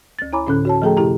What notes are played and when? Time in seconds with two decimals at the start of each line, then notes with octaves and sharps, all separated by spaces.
0.19 D2 A6
0.33 E4 C#5 G#5 A#5 B5 D6
0.47 A2 D3 C#4 A4 F#6
0.65 F#4 C#5 A5
0.82 F3 A3 G#4 A4 G5 A#5
0.97 F#2 C3 E4 G4 A#5